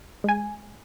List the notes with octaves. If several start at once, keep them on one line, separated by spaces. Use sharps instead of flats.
G#3 G#5